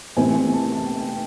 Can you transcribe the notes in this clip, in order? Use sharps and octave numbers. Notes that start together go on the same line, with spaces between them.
C3 E3 A3 C4 D#4 G#5
G#5
A5
A5
G5
G5